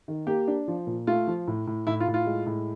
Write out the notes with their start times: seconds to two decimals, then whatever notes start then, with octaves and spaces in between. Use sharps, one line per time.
0.08 D#3
0.27 A#3 G4
0.48 D4
0.68 F3
0.87 A#2
1.07 A3 F4
1.27 F3
1.47 A2
1.67 A2
1.87 A2 E4
2.00 F4
2.08 A2
2.14 F4
2.26 G#3
2.46 A2